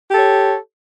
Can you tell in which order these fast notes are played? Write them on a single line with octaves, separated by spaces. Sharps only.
G4 A4 C#5